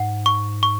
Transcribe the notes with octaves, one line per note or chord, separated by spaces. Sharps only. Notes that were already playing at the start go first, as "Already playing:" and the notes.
Already playing: G#2 F#5
C#6
C#6